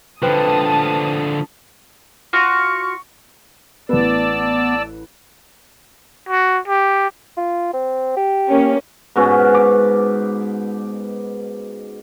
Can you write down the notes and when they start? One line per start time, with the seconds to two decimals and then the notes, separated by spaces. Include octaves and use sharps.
0.22 D3 F3 B4 C5 G5 A5 D#6
2.33 F4 F#4 F5 C#6
3.89 A1 B3 B4 D5 A5 E6
6.29 F#4
6.68 G4
7.37 F4
7.73 C4
8.17 G4
8.49 A#3 C#4
9.16 G#2 B2 C#4
9.54 D6